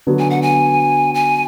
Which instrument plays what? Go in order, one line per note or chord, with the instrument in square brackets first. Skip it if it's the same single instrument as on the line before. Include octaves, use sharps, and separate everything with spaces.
[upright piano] D3 F#3 B3
[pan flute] G#5
F#5
G#5
G#5